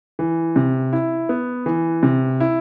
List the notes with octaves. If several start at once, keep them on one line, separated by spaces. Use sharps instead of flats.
E3
C3
E4
B3
E3
C3
E4